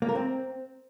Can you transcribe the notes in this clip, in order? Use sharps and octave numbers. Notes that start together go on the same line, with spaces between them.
A#3
A#4
C4